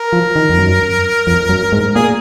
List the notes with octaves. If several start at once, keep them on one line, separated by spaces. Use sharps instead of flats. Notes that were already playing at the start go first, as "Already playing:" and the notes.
Already playing: A#4
F3
D#3
F2
F#2
F2
F#2
G#2
A#2 G#4